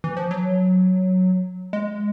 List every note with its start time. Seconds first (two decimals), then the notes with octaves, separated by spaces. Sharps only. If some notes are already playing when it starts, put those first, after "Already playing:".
0.04 E3
0.17 F3
0.31 F#3
1.73 G#3